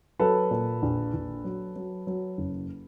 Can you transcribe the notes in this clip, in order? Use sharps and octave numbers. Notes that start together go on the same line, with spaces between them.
F#3 A4 B4
A#2
A#1
A#1
F#3
F#3
F#3
F#1